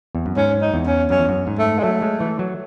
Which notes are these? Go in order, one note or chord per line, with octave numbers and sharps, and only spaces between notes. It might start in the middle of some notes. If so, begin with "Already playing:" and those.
E2
F#2
G#2 C#4
D#4
E2
C#4
F#2 C#4
E2
F#2
G#2
A3
G#3
F#3 A3
G#3
E3
F#3